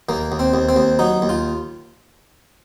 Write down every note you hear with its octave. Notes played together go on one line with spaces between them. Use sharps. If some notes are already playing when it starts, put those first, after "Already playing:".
D#2 A#3
D#2
C4
D#2
C4
D#2
F#3 D#4
D#2
F4